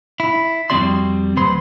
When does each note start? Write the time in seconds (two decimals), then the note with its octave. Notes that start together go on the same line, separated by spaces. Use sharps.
0.20 E4
0.70 F2 G3 C4 F#4 D5 C6
1.37 D2 F#3 B4 C5 C6